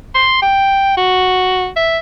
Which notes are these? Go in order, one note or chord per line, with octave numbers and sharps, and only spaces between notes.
C6
G5
F#4
E5